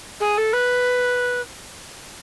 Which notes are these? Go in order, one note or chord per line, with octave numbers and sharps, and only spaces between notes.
G#4
A4
B4